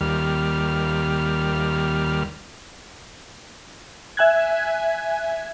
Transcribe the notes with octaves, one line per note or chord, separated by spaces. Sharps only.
D#2 G3 F6
E5 G#5 F#6 G#6